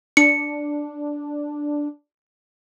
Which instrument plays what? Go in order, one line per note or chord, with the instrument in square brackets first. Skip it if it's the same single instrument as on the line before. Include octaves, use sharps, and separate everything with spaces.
[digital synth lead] D4 [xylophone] C#7